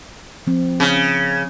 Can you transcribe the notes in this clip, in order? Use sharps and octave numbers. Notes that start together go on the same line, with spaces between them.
F3 C4
C#3